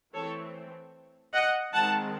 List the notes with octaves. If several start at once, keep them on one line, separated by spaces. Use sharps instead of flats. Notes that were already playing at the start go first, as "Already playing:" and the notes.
E3 A3 C4 A4 C#5
D#5 F#5
D#3 G#3 C4 F#5 A5